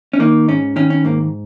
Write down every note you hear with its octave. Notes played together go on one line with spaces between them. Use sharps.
C#4
D#3 A#3 D#4
G#2 C#4
D#3 C#4
C#4
G#2 A#3